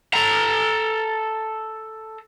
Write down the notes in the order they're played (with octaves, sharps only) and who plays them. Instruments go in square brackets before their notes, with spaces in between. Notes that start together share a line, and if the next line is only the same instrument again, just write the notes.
[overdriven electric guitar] A4 A#5